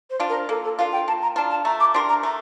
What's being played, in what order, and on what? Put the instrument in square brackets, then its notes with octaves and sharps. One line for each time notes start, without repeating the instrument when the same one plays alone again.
[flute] C5
[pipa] D4 F4
[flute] A#4
[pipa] A#3 [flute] A4
[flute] A4
[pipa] D4 F4 [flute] F5
[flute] G5
[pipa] A#3 [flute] A5
[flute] A#5
[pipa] D4 F4 [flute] A5
[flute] A5
[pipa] A3 [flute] A#5
[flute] D6
[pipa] D4 G4 A#4 [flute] C6
[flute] A#5
[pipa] A3 [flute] A#5